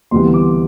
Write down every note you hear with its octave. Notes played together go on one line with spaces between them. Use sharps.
D2 C3 E3 G3 B3 C6
D6